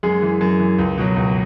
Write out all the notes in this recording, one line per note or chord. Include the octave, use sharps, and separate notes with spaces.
F#2 G#3 G#4
E3
F#2
E3
C#2
B2 F#3
C#2